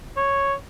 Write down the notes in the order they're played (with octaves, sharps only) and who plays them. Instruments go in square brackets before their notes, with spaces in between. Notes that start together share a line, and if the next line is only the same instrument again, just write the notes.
[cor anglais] C#5